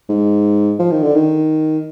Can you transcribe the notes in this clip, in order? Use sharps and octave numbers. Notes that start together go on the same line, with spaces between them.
G#2
F3
D#3
D3
D#3